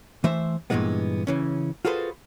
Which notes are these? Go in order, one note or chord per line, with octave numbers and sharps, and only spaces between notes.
E3 A3 C5 E5
G2 A#2 C#3 E3 G#3 B3
C#3 E3 C#4
F4 F#4 G#4 A4 B4 C5